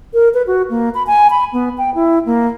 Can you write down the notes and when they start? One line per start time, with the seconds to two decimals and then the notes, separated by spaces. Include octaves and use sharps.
0.14 A#4
0.34 B4
0.47 F#4
0.70 A#3
0.95 B5
1.07 G#5
1.30 B5
1.53 B3
1.78 G5
1.95 E4
2.26 A#3